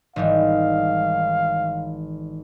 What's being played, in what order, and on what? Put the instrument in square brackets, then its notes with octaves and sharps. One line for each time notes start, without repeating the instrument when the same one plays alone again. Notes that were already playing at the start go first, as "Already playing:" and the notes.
[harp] G#1 E3 G3 [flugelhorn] F5